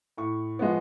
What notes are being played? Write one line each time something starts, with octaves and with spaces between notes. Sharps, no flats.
A2 C#6
F3 G#3 B3